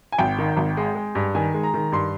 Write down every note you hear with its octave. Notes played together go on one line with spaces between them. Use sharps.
G#5
G#1 G5
D#3
G#1
G#3
G#3
G2
D#3 G#5
G#3
A#5
D#3
G2 C6